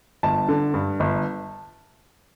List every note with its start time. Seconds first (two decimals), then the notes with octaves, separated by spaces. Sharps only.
0.23 G1 A5
0.48 D3
0.74 G2
1.00 G1